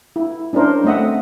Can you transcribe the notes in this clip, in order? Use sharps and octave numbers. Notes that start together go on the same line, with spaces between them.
E4
C#4 D4 E4 A#4 C5
A3 C4 D#5 E5 F#5